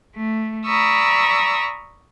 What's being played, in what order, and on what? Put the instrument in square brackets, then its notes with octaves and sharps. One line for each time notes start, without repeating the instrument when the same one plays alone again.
[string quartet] A3
D5 A#5 B5 C#6 D#6 E6